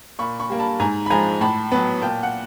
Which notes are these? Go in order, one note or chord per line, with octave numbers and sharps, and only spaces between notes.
A#2 B5 C#6
B5 C#6
G3 A#3
A5 B5
G#2 G#5 A#5
B5
F3 G#3 G#5 A#5
A2 A5 B5
F#3 B3 A5 B5
A#2 G5 A5
F#5